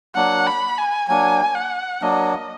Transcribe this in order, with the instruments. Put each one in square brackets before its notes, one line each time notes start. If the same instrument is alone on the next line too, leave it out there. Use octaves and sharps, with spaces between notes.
[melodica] F#3 A#3 D4 [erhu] F#5
[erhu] B5
G#5
[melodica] F#3 A#3 D4 [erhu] G#5
[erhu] F#5
[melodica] F#3 A#3 D4 [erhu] D#5